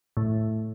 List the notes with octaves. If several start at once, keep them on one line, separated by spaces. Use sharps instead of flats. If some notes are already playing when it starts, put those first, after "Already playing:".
A2